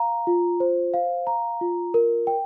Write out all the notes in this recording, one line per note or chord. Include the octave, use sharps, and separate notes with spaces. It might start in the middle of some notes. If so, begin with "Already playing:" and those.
Already playing: F5 A#5
F4
C5
F5
A#5
F4
A#4
G5